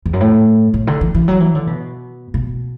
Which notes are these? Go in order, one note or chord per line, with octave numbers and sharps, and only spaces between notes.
E2
F#2
A2
A2
D3
E3
E3
F#3
E3
D3
B2
B2